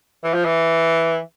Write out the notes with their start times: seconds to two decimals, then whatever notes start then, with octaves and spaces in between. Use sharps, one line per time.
0.24 E3
0.34 F3
0.45 E3